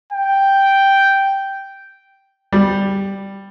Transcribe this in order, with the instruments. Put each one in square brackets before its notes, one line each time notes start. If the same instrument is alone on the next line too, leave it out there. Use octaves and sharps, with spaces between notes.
[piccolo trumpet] G5
[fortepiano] G3